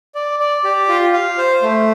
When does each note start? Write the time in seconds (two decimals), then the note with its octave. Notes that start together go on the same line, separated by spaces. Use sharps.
0.15 D5
0.40 D5
0.64 G4
0.89 F4
1.13 F5
1.38 C5
1.62 A3